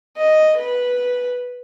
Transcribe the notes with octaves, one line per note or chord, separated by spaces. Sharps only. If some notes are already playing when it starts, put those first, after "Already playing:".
D#5
B4